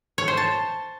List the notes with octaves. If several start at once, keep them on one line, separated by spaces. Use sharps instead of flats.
C#5
C5
A5